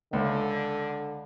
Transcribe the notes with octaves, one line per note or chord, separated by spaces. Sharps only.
C#2 D3